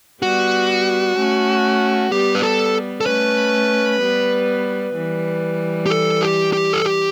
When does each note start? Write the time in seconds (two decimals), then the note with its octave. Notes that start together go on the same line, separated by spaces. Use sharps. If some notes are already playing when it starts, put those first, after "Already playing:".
0.22 G3 B3 F#4
1.17 A3 C#4
2.11 G3 B3 G4
2.35 B4
2.43 A4
3.01 A4
3.06 A3 C#4 B4
4.01 G3 B3
4.95 E3 G3
5.86 G4
5.90 A4
6.22 G4
6.53 G4
6.73 A4
6.85 G4